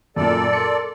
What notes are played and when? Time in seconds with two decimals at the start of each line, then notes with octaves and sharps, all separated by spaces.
0.16 F#2 A#2 A4 D5
0.53 A#4 C6 C#7